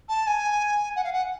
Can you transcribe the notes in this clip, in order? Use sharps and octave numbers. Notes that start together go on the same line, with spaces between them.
A5
G#5
F#5
F5
F#5